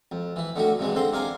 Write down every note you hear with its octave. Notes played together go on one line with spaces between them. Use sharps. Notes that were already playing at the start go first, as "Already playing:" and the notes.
F2
E3 E4
D3 D#3 A3 F#4
G2 C3 E3 G#3
D3 C4 A#5 C6
C3 D4 F5 G#5 A#5